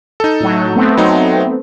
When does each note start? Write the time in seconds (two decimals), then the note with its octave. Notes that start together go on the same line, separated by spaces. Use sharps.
0.20 D#4 A4
0.40 A2 F#3
0.76 A3 B3 C4
0.97 F#3 D#4